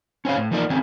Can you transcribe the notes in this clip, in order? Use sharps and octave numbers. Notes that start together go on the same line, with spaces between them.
C#4 C5 C#5 F5
A2
E3 F3 A#3 D#4 A#4 D5
D#3 G#3 C4 C#4